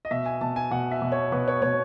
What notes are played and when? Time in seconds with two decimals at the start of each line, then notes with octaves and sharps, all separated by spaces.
0.05 D#5
0.11 B2 E5
0.26 G#5
0.41 B2 A5
0.56 G#5
0.71 B2 F#5
0.92 E5
1.02 B2
1.12 C#5
1.32 B2 B4
1.48 C#5
1.62 B2 C#5